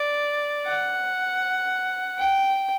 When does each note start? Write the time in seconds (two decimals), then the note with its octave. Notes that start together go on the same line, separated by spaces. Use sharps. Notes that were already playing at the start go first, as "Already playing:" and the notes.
Already playing: D5
0.67 F#5
2.18 G5